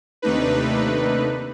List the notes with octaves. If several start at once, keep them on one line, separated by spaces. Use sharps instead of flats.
D#2 C3 A3 D4 D#4 B4